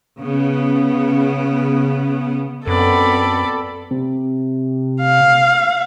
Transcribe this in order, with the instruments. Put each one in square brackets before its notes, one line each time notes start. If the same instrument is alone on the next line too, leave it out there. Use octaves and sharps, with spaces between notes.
[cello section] C#3 B3
[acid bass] F#2 [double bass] B3 C4 [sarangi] A4 [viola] D5 B5
[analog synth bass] C3
[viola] F5